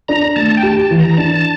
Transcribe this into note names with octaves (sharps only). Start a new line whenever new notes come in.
D4 A#5
A3 A5
G5
G4 A5
A5
E3
A#5
A#5
D4 A5